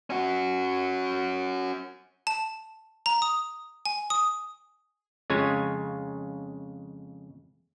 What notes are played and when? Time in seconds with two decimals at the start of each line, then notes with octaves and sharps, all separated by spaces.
0.10 C#4 F#4
2.27 A5
3.06 A#5
3.22 D#6
3.86 G#5
4.10 D#6
5.30 F2 C#3 G#3 F4 C#5 G#5